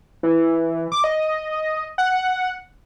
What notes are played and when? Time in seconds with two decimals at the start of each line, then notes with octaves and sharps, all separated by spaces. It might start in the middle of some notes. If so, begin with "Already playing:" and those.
0.23 E3
0.92 D6
1.04 D#5
1.98 F#5